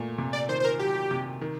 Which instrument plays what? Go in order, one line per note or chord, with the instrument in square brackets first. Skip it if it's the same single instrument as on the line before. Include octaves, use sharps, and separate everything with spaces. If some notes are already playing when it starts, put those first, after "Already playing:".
Already playing: [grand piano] A#2 A3
C3
[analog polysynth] D5
[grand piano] D#3 [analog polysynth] C5
[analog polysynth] C5
A#4
[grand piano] F#3 [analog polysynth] G4
[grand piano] C3
D#3